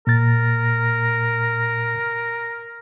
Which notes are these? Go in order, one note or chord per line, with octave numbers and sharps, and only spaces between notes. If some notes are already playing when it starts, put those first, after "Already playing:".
A#2 A#4 A6